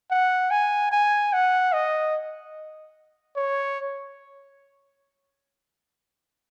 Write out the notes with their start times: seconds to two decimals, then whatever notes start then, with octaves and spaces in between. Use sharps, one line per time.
0.11 F#5
0.51 G#5
0.92 G#5
1.33 F#5
1.73 D#5
3.36 C#5